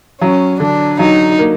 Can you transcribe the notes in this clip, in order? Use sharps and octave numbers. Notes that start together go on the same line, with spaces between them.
F#3 C#4
D3 D4
F#3 D#4
A#3